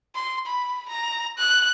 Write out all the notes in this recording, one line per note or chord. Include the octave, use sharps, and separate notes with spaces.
C6
B5
A#5
F#6